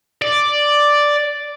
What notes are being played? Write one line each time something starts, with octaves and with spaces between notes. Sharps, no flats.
D5